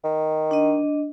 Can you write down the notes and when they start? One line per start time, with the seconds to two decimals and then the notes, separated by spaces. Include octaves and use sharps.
0.04 D#3
0.51 D4 D#5